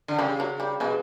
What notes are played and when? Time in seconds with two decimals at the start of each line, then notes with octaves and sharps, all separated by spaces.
0.08 D3
0.19 C#3 G3
0.40 F#3
0.60 G3
0.80 B2 G#3